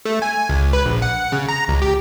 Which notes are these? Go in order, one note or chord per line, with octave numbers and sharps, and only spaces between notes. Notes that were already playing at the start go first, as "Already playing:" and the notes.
A3
G#5
C#2
B4
A#1
F#5
C#3
A#5
C#2
G4